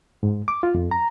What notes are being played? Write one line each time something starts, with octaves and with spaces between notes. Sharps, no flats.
G#2
D6
F4
F2
A#5